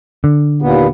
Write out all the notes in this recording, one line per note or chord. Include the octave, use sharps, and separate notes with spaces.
D3
D#2 A#2 B3